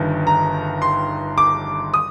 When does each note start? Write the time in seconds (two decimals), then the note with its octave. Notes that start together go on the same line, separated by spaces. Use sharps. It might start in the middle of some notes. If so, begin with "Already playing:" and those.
Already playing: G1 G2 D#3
0.27 A#5
0.82 C6
1.38 D6
1.94 D#6